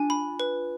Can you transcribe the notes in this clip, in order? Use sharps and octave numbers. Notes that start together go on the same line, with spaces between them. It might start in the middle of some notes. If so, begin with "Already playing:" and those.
Already playing: D4 F4 G#5
B5
B4